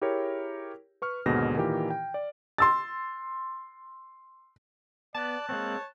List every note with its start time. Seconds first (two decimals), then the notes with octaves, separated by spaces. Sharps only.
0.02 E4 G4 G#4 A#4 C#5
1.02 B4 C#6 F6
1.26 D#2 G#2 B2 D3 G#4 A#6
1.57 A#2 D#3 E3 G4
1.90 G5
2.14 D5
2.58 C6 E6 A6
5.15 B3 D5 A5 F#6
5.49 G#3 A#3 C4 C#5